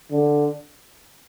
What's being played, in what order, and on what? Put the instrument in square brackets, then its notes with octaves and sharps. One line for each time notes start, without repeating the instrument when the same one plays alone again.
[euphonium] D3